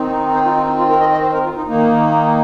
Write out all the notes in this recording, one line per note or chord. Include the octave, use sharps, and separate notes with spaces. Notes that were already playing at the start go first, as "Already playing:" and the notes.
Already playing: D#3 C4 D#4
C5
F4
F4
D#4
F4
A#4
D#5
D#5
C5
A#4
F4
D#4
D#3 A#3 D#4